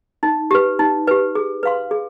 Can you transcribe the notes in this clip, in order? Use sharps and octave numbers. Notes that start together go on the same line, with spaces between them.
D#4
G4 B4
D#4
G4 B4
G#4
B4 F5 C6
G#4